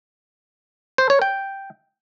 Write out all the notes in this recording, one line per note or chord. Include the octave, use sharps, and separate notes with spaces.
C5
C#5
G5